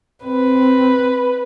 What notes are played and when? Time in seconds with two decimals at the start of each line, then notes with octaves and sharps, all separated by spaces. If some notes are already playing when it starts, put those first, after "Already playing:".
0.24 C4 B4